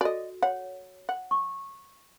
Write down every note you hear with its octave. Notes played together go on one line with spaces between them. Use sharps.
F#4 A4 D5 D#5
C#5 F#5
F#5
C#6